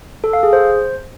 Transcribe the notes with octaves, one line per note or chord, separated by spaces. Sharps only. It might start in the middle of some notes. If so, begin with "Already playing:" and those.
A4
F5
G#4
C5